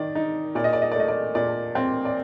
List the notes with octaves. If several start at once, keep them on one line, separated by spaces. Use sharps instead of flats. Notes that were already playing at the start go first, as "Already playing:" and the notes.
Already playing: D#3 D5
D#4
A#2 D5
D#5
D5
D#5
D5
A3 D#5
D5
A#2 D5
C4
D5